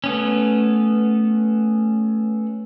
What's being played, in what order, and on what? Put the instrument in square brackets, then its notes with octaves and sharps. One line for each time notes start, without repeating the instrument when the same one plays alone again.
[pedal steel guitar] A3 B3 C#4